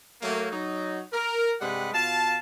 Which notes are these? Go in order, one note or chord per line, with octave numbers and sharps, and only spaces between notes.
F#3 A3 A#3
F#3 D#4
A#4
G2 C3 G3 G#3 B4 F#5
B2 F4 F5 A5